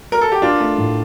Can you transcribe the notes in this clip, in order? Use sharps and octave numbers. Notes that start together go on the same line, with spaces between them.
A#4
A4
G4
D4 F4 A#4
A3
A2